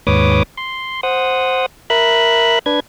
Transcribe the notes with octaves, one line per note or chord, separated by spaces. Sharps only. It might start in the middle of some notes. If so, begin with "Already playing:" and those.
D#2 G#2 B4 C#5 D6 D#6
C6
C5 F#5 D#6
A#4 E5 B5 F#6
D4 B4 G#6